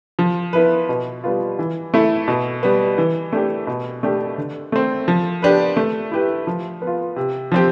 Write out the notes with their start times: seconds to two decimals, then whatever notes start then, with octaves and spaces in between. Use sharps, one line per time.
0.19 F3
0.53 B3 E4 B4
0.89 B2
1.24 G3 B3 F4
1.59 E3
1.94 A3 E4 A4
2.28 B2
2.63 G3 B3
2.98 E3
3.33 A3 D4 G4
3.67 B2
4.03 A3 D4 G4
4.38 D3
4.72 A3 C4
5.08 F3
5.42 B3 D4 G4 B4
5.77 A3
6.12 E4 G4 B4
6.47 F3
6.82 B3
6.87 F4
7.16 C3
7.52 F3 C4 G4